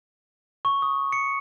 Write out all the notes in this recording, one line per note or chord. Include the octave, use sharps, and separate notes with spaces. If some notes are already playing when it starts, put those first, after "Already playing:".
C#6
D#6
C#7